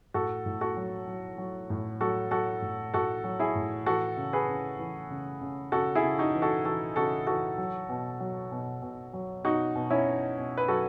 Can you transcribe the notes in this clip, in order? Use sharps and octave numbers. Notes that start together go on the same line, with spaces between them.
A2 F#4 A4
A2
F#4 A4
F#3
F#3
F#3
A2
F#3 F#4 A4
F#3 F#4 A4
A2
A2 F#4 A4
F#3
E4 G#4
A2
E3 F#4 A4
C#3
G#4 B4
C#3
E3
C#3
C#3
C#3 F#4 A4
E4 G#4
C#3
D#4 F#4
E3
F#4 A4
E3 F#4 A4
C#3 F#4 A4
E3 F#4 A4
F#3
B2
F#3
B2
B2
F#3
B2 D#4 F#4
B2
C#4 E4
B2
B2
B4
F#3 F#4 A4